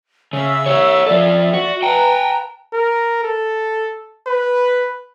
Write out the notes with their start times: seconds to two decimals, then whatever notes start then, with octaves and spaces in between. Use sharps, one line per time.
0.33 C#3 E5 E6
0.66 G4 C#5
1.06 F3 A4 D5 E5
1.54 F#4
1.83 B4 F#5 G5 A5 A#5
2.73 A#4
3.24 A4
4.27 B4